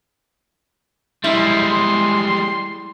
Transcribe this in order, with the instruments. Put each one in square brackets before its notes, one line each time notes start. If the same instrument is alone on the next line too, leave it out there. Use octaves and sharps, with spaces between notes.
[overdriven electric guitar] G3 G#3 [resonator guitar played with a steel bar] E4 [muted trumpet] C6